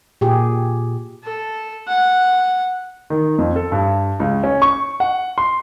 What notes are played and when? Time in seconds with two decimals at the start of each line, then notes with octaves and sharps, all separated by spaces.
0.21 A#2 G4 G#4
1.23 A4
1.87 F#5
3.10 D#3
3.38 F2
3.56 A4
3.72 G2
4.20 C#2
4.44 C#4
4.62 C#6
5.00 F#5
5.38 C6